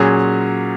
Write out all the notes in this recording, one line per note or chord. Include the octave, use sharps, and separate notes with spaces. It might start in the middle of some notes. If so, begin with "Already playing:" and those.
Already playing: A#2 F#3 C#4 G#4